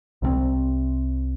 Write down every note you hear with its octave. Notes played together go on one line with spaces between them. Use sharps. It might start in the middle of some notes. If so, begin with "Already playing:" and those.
C2 C3 F#3 C4